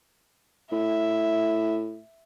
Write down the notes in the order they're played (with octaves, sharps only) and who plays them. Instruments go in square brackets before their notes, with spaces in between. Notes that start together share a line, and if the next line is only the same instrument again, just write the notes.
[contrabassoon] A2 [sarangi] E5